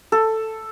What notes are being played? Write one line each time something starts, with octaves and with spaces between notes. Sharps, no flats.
A4